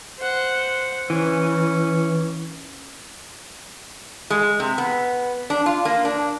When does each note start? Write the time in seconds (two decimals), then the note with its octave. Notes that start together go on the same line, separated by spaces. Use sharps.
0.19 C5 F#5
1.10 E3 C#4
4.30 G#3
4.60 C3
4.78 B3
5.50 D4
5.66 F4
5.85 A#3
6.05 D4